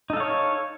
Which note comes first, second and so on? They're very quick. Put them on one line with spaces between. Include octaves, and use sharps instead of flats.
D#4 A4 F5 C#5